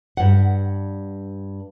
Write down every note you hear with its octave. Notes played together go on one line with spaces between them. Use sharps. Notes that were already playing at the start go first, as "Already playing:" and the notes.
G2 F#5